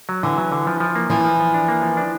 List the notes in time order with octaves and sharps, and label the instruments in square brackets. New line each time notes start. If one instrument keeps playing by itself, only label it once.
[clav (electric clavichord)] F#3
[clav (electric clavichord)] D3 [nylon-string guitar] E3
[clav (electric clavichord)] F#3
D3
F3
F3
A#3
[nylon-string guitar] E3 [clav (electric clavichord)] F3
[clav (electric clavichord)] F3
F3
D4
A#3
F3
D4